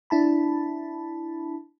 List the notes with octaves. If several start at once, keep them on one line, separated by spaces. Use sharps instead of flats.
D4 E4 A5 B5